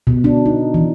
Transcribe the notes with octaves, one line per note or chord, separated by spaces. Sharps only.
B2
D4
D#4
E3